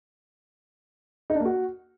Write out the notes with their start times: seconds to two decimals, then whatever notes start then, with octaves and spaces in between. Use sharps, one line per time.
1.30 D#4
1.35 D4
1.40 A#3
1.45 F#4